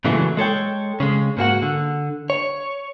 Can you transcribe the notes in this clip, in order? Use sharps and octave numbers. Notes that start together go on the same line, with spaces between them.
A#2 C#3 E3 F#3 G#3 A3
G#3 A4 C#5 G5
C#3 G#3
G#2 A#3 F#4 F#5
D3
C#5